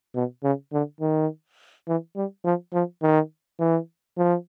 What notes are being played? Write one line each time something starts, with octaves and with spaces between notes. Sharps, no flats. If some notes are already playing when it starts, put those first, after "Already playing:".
B2
C#3
D3
D#3
E3
G3
F3
F3
D#3
E3
F3